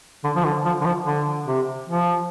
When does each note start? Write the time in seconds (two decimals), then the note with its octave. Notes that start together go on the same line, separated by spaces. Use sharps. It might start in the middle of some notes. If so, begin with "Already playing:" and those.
0.24 D3
0.36 F3
0.44 D3
0.65 F3
0.81 D3
0.86 F3
1.06 D3
1.47 C3
1.89 F3